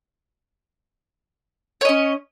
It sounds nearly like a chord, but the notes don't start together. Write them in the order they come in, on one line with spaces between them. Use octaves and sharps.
C#5 D#5 C#4